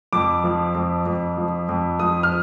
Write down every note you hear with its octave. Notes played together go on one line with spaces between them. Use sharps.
F2 D6
F3
F2
F2
F3
F2
F3 D#6
F6